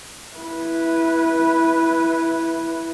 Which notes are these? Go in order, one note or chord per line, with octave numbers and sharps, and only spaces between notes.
E4 B4